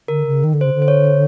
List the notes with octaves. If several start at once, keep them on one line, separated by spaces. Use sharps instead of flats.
D3 A#4
C#3
D#3
D3
C5
C#3
D3
C5
C#5